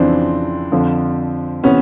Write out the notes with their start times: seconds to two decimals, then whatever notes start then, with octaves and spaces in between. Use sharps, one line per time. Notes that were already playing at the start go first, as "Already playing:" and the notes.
Already playing: F2 C#3 E3 C4 D4
0.72 F2 D3 F3
1.64 C3 E3 B3 C#4